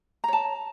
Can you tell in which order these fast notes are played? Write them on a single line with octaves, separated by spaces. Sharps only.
A#5 C#5 A5